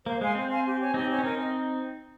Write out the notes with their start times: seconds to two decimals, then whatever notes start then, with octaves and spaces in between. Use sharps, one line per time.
0.06 A#3 C5
0.21 G#3 F5 G#5 C6
0.35 C4 C5
0.50 F5 G#5 C6
0.65 G4
0.80 C#5 G#5
0.94 C4 D#4 G4
1.09 C#5 G#5
1.18 C#4
1.23 C4 D#4 A#4
1.38 D#5